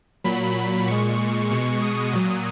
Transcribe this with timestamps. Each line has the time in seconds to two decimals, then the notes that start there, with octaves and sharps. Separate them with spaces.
0.24 A#2 F#3 B5
0.87 A#2 G#3 C#6
1.50 B2 G#3 C#6
1.82 D#6
2.13 A#2 F#3